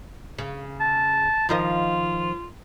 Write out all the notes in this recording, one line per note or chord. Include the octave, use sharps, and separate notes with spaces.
C#3
A5
D#3 F3 F4 D#5